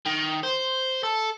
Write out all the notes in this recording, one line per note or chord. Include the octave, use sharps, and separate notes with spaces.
D#3
C5
A4